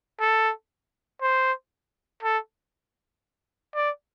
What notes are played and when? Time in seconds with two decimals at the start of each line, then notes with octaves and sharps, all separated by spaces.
0.20 A4
1.21 C5
2.23 A4
3.75 D5